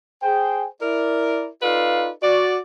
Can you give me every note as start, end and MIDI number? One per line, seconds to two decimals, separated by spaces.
0.23 0.67 68
0.23 0.67 72
0.23 0.67 79
0.81 1.47 64
0.81 1.47 70
0.81 1.47 74
1.62 2.10 63
1.62 2.10 65
1.62 2.10 69
1.62 2.10 71
1.62 2.10 74
1.62 2.10 77
2.22 2.58 66
2.22 2.58 74